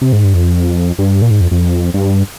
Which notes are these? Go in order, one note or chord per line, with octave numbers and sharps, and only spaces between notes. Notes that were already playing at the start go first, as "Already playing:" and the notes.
C3
G#2
G2
F2
G2
A#2
G#2
F2
F2
G2